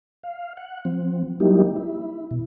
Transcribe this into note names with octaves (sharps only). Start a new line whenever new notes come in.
F5
F#5
F3 C4
F#3 G3 A#3 D#4 E4 G4
E4
B2